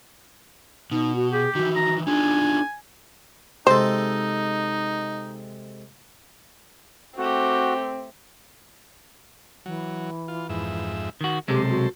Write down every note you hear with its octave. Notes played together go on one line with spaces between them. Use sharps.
B2 D#4
F#4
G4 G#4
D#3 E3 F#4
A#5
D4 D#4 F4 G#4 G#5
C3 G#3 D#4 A4 C5
A3 C4 F#4 G4
E3 F#3
F4
F2 G#2 E5
D#3 F#4
B1 C3 G#3 G4 A4 C5
F#4